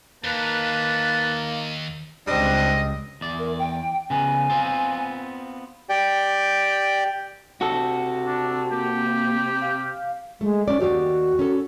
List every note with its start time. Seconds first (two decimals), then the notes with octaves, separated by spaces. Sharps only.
0.24 D#2 A#3 B4 A5
2.27 C#2 G3 C4 D4 D#5
3.21 E2 D5
3.39 A#4
3.59 G5
4.10 C#3 B3 G#5
4.50 B3 C4 F4
5.89 G4 D5 G5
7.61 C3 F#4 A4
8.27 D4
8.71 A#3 G4
9.61 F5
10.41 G#3 A3
10.68 C#4 D5
10.80 D#2 F#4 G4 D5
11.39 C#4 A4